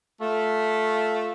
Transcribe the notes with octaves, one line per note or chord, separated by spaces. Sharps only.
A3 F4